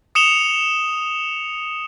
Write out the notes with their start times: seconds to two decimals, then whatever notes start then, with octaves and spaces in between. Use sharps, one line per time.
0.15 D#6 C#7 E7 F7 G7